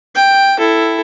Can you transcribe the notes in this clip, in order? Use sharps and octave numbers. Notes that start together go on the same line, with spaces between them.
G5
E4 A4